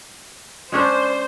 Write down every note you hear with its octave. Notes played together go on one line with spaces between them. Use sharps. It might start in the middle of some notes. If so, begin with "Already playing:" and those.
G#3 C#4 D4 C5